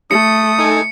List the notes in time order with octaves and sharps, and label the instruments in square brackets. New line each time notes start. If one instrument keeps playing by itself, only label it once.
[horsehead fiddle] A3 [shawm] D#6 [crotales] C#7
[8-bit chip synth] D#4 A4 G#5